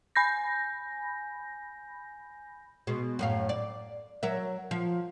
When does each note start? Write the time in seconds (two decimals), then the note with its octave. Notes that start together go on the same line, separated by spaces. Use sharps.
0.16 G#5 B5 G6 A#6
2.87 B2 G#3
3.19 F#2 A2 F5
3.49 D5
4.23 F#3 A#4 E5
4.71 F3